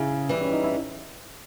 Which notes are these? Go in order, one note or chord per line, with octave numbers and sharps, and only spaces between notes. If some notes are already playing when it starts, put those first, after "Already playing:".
Already playing: C#3 E4 G#4
E3 G3
C#4
D#4
E4